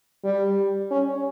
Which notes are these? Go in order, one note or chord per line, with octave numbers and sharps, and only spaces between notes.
G3
C#4